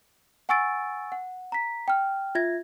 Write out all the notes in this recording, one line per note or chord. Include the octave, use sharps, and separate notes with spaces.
F#5 G#5 C#6 E6 A6 D7
F#5
A#5 B6
G5 F6
F4 E5 G#6 A#6